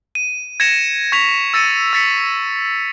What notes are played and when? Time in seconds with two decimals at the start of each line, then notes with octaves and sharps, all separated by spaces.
0.15 D#7
0.60 G#6 A#6 C#7 E7
1.12 C#6 G#6 B6 F7
1.54 E6 A6 A#6 C#7 D#7
1.93 E6 A6 B6 C#7